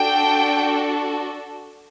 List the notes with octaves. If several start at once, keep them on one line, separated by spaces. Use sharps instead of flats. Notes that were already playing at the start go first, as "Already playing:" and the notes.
Already playing: D4 F#4 A4 G5